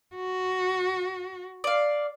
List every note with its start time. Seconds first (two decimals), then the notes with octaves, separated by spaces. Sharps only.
0.15 F#4
1.64 D5 F5